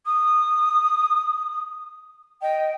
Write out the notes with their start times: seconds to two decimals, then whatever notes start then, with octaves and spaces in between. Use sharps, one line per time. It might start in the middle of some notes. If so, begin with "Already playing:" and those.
0.05 D#6
2.42 D#5 G5